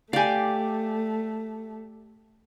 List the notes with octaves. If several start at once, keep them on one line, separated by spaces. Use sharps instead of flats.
A3 G4 D5 F5 G#5